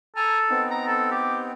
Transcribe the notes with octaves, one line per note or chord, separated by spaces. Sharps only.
A4 G#5 A#5 F6
B3 C4 D#4
A#5
A4
G4